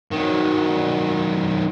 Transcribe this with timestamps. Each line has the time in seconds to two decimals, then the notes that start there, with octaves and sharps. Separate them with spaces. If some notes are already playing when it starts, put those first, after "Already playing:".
0.11 D#3 F#3